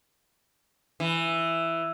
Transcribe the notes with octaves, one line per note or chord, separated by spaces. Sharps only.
E3